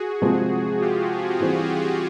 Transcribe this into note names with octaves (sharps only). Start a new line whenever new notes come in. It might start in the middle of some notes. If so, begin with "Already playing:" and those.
Already playing: F#4 G#4
C3 F3 G#3 C4
F4 G4
E3 G3 C4